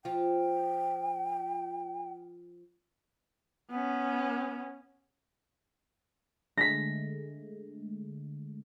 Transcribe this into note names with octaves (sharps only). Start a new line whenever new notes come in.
F3 F4 G5
B3 C#4
D3 G#3 A3 A#6 B6